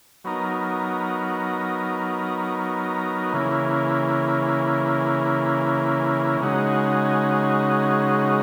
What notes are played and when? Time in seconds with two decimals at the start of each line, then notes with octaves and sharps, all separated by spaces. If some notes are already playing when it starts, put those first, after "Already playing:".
0.24 F#3 B3 D#4 A#4
3.33 C#3 E3 A#3
6.41 C#3 G#3 D#4 F#4